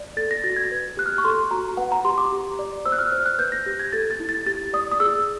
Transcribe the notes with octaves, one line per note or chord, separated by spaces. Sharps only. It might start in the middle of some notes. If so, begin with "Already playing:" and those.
Already playing: D5
A4 A6
A#6
F#4 A6
G#6
B4
G4 F#6
F6
C#6
A4 C6
F#4 A#5
B4 F#5
A#5
G4 C6
D6
G4
D5
C5 E6
F#6
F6
C5 F6
F#6
B4 G6
A#6
G4
G#6
A4 A6
A6
E4
A6
G4 A6
D5 D#6
D#6
G#4 E6